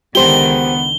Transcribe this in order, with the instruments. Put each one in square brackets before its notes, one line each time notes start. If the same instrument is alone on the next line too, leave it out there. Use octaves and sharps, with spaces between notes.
[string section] C#2 D3 D#3 [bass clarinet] B3 [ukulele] G4 C5 [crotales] G7